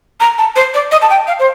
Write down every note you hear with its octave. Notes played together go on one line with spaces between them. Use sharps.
A#5
A5
C5
D5
D#5
A5
G5
F5
C5